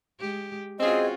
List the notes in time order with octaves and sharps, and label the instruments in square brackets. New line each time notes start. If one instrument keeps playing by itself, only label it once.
[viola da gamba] G#3 G4
[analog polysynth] C4 G#4 [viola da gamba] C#4 F4 F#4 [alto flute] D#5